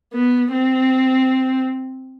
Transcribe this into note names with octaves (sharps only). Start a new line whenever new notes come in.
B3
C4